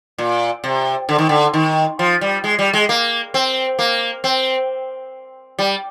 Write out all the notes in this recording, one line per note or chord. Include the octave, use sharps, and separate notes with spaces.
A#2
C3
D3
D#3
D3
D#3
F3
G3
G#3
G3
G#3
A#3
C4
A#3
C4
G3